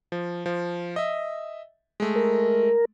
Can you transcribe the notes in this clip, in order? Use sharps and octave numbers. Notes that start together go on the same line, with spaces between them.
F3
F3
D#5 E5
G#3 A3
A#4